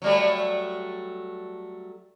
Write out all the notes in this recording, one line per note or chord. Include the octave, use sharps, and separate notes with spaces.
F#3 G3 A3